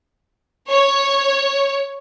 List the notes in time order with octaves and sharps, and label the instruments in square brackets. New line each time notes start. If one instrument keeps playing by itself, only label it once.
[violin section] C#5